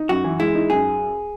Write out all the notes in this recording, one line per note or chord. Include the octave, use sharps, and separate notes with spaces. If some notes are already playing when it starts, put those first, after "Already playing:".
Already playing: D#4
F#2 F#4
E3
G#3 E4
D#4
F#2 G#4